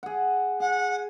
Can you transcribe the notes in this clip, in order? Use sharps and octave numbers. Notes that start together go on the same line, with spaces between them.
G#4 F#5
G#4 F#5